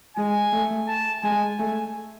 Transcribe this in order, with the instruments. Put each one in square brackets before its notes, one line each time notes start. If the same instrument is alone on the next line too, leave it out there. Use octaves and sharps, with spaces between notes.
[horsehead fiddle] G#3 [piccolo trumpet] G#5
[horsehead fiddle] A3
[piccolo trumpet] A5
[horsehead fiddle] G#3 [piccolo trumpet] G#5
[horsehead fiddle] A3 [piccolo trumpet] G#5